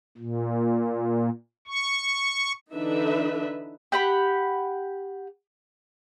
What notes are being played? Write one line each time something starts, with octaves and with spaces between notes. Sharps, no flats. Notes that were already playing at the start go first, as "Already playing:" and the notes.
A#2
C#6
D3 E3 D4 D#4 B4 E5
G4 F#5 B5